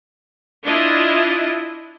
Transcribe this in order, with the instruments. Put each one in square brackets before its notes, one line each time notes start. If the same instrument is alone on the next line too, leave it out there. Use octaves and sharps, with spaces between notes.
[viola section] D4 E4 F4 D#5